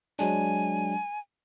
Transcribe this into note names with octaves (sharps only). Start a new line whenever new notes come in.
F#3 G#3 D4 G#5